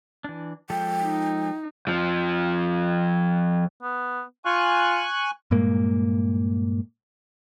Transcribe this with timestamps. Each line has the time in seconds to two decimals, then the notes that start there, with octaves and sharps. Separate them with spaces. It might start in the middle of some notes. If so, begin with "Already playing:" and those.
0.24 E3 D4
0.70 F3 G#3 A4 G5
1.03 D#4
1.87 F2 F3
3.83 B3
4.45 F4 G#5 C#6 F#6
5.51 G2 A#2 G#3 A#3